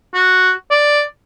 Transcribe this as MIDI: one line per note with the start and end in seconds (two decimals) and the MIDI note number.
0.14 0.52 66
0.71 1.03 74